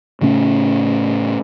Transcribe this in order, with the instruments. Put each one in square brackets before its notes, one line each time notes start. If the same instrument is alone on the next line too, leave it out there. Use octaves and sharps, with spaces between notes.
[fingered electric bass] A2 C#3 A3 C#4